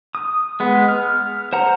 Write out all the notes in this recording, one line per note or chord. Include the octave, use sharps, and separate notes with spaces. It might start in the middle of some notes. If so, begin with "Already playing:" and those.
D#6
G#3 B3
F6
C5 F#5 A#5